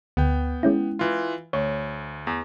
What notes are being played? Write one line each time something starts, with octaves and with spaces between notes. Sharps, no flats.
D2 B3 G5
G#3 C#4 E4
E3 F4
D2 C#5
E2